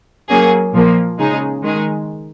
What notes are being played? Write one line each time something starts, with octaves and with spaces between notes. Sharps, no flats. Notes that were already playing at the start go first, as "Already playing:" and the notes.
F#3 A#3 C#4 G#4
A#2 F3 A#3
C#3 G#3 D#4 G#4
D#3 G#3 D#4 G#4